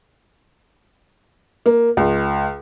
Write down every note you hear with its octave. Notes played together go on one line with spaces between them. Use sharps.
A#3
C#2